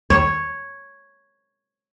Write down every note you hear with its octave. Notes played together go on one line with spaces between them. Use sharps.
D#2 G3 C#5 E7